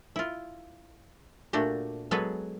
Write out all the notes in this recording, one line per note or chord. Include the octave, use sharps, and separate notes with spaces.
E4 F4
A#2 A3 D4 F#4 G4
F#3 G#3 B3 G#4 A4 B4